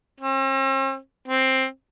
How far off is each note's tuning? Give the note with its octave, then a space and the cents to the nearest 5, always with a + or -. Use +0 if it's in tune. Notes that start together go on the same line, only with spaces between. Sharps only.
C4 +45
C4 +10